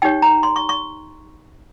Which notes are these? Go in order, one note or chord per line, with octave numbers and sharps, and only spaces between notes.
D#4 G4 C#5 G5
A#5
C6
C#6
C#6